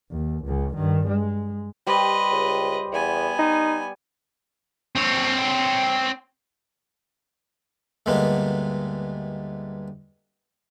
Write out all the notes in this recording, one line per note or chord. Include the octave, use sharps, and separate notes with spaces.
D#2
C#2 C#3
G2 D#3
G#3
G3 G4 B4 C5 D#5
C#2
E2 B3 G#5
D#4
C4 C#5
D2 G2 G#3 A#3 B3